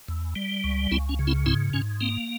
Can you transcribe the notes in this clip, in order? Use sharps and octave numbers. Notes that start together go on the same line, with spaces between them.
E2
G3
C#2
C#2 C4 E4
C#4
C#3
C4 E4
G#2 C4 E4
G#2 C#4
A#3 C4